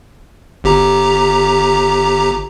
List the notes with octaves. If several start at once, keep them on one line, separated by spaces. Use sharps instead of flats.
G1 G4 A#5